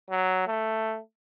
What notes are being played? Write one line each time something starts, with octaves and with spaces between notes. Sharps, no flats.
F#3
A3